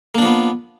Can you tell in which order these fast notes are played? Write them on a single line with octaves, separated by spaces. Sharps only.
A#3 D4 F3 B3